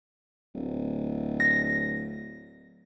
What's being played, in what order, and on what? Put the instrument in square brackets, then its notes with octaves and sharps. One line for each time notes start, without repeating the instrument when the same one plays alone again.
[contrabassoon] D1
[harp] A#6